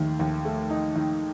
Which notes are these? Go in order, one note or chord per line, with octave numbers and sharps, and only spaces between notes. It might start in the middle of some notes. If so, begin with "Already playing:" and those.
Already playing: D#2 D#3 A3
D#2
A3
D#4
D#3